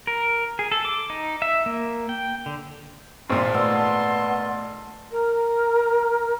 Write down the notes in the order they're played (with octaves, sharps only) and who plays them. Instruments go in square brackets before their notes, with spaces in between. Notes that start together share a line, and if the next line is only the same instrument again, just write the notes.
[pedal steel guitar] A#4
G#4
A4
D6
D#4
E5
A#3
G5
D3
[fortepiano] G#1 A#2 [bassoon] C4 [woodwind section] A5 C6
[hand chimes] A3 D5 E6 [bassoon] B3
[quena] A#4